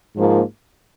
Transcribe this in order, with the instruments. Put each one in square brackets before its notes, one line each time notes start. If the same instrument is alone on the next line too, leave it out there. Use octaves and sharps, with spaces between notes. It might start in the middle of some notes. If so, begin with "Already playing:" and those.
[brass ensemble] G#2 F3 A#3